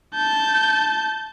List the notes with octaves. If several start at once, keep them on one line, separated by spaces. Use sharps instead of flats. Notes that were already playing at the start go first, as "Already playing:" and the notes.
A5 G6